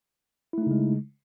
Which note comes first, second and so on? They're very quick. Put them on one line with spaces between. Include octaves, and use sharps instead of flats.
E4 A3 D#4 C#3 G#3